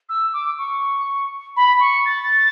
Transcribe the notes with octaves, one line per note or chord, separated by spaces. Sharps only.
E6
D6
C#6
B5
C#6
A6